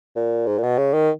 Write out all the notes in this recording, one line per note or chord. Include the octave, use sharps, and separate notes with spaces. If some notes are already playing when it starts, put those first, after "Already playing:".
A#2
G#2
A#2
B2
C#3
D#3